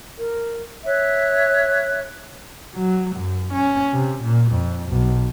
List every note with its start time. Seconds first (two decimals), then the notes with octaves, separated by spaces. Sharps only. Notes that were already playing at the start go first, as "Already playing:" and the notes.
0.18 A#4
0.86 C#5 E5 F#6
2.75 F#3
3.16 F#2
3.53 C#4
3.93 C3
4.22 A#2
4.52 F2
4.89 B1